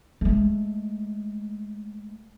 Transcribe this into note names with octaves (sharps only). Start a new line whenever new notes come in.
G#3 A3